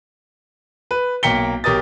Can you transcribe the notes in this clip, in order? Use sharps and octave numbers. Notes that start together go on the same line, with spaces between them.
B4
B1 A#3 G5 B6 C#7 G7
B1 G4 A#4 D#6 A6